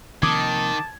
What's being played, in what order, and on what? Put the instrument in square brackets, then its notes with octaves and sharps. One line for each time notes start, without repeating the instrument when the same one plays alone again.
[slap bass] C3 F3 A#3 [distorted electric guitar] D#3 [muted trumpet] A5 [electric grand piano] D6 D#6 G#6